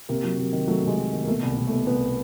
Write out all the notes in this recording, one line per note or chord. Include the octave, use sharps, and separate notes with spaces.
C3 A#3
F#3
C3 A#3
D#3
F#3 A3
C3 G#3
F#3
D#3
A#3
B2 A3
C2
C2
A3
B2
C2 B3